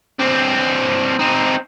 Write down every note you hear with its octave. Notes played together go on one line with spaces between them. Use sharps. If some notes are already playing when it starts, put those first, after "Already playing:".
C4 D4
C4 D#4